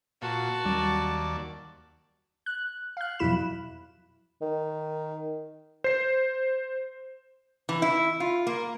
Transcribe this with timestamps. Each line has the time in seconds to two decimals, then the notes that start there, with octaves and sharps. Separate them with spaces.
0.22 A#2 F#4 A5
0.65 D#2 F#3 G3 C#4 D5
2.46 F#6
2.97 F5 F#6
3.19 F2 B2 F#3 E4 B5 E7
4.41 D#3
5.84 C5 C7
7.69 E3
7.82 E4
8.20 F4
8.47 A#3